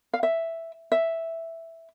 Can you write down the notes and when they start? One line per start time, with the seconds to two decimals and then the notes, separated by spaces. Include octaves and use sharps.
0.14 F5
0.23 E5
0.92 E5